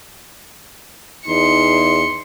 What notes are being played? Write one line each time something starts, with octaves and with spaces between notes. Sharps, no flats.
E2 D#4 C6 C#7